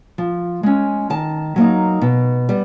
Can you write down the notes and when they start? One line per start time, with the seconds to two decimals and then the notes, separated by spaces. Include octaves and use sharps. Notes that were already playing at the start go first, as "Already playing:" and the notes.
0.18 F3
0.63 G#3 C#4
1.10 D#3 A5
1.56 F#3 A#3 D#4
2.02 B2
2.49 G3 B3